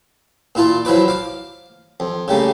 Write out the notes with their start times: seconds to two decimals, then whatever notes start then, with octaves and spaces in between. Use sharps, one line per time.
0.55 A#2 E4 F4 A5
0.85 F3 F#3 E4 B4 D6
1.08 F5 D6
2.00 F2
2.28 C#3 G3 A3 A#3